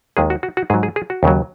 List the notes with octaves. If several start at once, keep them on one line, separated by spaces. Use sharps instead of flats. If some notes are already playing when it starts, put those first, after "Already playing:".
D#2 D#3 G#3 G#4
F#4
F#4
F#4
G#2 F#3 G#4
G#4
G#4
F#4
D#2 C#3 F#3